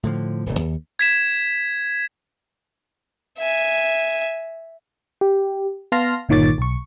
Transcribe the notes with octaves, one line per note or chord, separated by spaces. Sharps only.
A2 D3 F3
D#1 G#1 C#3
D#2
G#6 B6 E7
E5 G#5
G4
B3 F5 A5 C6 F6 A#6
G1 A#2 D#3 C#5 D6 A6
B1 C#6